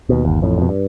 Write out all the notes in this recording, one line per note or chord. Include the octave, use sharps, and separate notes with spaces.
D#2 B2
G1 D#2
A1 F2 A2
F2 B2
G2